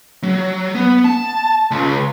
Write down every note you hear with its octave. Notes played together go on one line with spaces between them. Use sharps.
F#3
B3
A5
C#2